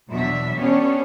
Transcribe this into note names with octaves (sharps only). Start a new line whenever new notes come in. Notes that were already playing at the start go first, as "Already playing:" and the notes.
E2 B2 F#3 D4 E5
B3 C#4 D4 G4 C#5